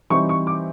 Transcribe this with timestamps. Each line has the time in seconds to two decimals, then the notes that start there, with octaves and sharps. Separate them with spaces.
0.10 E3 G3 C4 D#4 C#6
0.29 C#6
0.47 D6